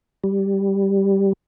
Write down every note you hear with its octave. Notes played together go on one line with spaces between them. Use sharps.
G3